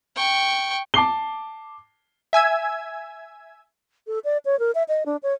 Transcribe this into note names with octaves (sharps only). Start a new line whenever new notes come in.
G5 C#6
A5 D6 C7 G7
E5 G#5 E6 G#6
A4
D5
C#5
A#4
E5
D#5
D4
C#5